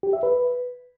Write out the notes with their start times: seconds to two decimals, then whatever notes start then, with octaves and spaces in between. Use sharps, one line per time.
0.03 G4
0.13 E5
0.23 B4